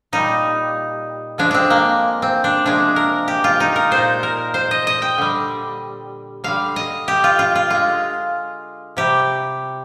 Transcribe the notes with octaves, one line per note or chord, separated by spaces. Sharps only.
A#2 G3 D#4
D3 F3 G#3 D4
C4 D4
A#3
C4
D4
C3 F3 G#3 D4
A#4
G4
F4
D#4
A#4
A#2 G#3 C5
A#4
C5
D#5
D#5
G5
D3 G3
D3 G3 F5
D#5
G4
F4
F4
F4
D3 G#3 F4
C3 G3 G4